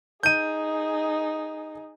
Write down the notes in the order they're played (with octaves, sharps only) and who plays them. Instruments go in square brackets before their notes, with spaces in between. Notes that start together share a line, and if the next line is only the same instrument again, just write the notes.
[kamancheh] D#4 G#4 [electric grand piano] G6 D#7